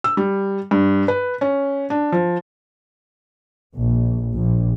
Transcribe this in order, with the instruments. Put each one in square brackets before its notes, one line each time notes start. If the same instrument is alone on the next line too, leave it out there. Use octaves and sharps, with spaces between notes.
[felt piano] E6
G3
G2
B4
C#4
D4
F3
[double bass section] A#1
A#1